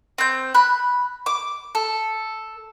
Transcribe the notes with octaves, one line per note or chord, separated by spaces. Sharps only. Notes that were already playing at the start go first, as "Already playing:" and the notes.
C4 G6
B5 F#6
D6
A4